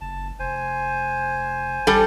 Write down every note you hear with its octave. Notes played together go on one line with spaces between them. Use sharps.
F#1 A5
F1 C5 G#5
A1 G3 A4